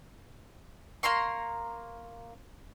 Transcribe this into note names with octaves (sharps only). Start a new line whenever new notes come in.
A#3 A#5 C6 C#6